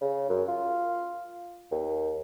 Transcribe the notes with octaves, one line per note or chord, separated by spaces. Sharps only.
C#3
F#2
F4
D#2